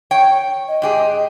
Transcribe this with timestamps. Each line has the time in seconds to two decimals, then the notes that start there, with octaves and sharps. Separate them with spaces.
0.11 C#5 G5
0.68 D#5
0.82 G#2 G4 G#4